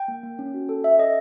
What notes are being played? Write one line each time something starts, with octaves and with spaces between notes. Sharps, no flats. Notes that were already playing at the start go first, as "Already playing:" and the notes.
Already playing: G5
A#3
A#3
C#4
F#4
A4
C#4 E5
A4 D#5